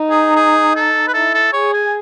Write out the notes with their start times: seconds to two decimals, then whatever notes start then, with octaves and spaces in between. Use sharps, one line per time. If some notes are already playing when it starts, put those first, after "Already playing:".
Already playing: D#4
0.10 G#4
0.36 G#4
0.76 A4
1.08 B4
1.14 E4 A4
1.34 A4
1.53 G#4 C#5
1.74 G#5